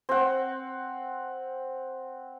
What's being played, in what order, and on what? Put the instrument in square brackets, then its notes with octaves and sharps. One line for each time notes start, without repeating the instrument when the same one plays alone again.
[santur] C4 F#5